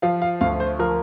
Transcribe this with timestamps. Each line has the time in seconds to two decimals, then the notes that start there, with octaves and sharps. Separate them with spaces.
0.02 F3 F5
0.22 F5
0.41 D2 F5
0.60 C5
0.79 F3 A#4